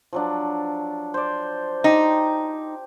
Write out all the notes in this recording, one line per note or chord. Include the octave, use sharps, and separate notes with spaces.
F3 F#3 D4
C5 D5
D#4 G4